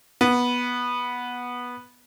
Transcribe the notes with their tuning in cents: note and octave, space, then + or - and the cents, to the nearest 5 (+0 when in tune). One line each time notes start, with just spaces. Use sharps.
B3 -10